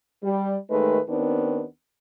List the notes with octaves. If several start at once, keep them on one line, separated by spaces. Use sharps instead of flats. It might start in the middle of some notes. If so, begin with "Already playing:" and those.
G3
D#2 D#3 G#3 A3 B4
D#2 D#3 B3 C4 D4